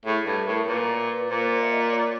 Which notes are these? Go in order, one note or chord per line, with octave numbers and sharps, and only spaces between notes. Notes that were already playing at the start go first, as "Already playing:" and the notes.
A2 G#4
G2 A4
A2 A#4
A#2 B4
A#2 C5
E5
D#5
D5
C#5